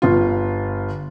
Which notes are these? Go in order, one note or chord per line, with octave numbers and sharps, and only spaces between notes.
G1 F4